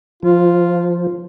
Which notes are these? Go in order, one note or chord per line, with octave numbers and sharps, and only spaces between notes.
F3 F4